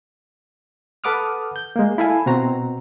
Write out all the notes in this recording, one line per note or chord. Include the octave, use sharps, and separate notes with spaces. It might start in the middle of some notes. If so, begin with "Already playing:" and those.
A4 B4 F#5 D6 D#6 F6
G6
G#3 A#3
E4 A4 F5 G#5
B2 C4 F#4 A#5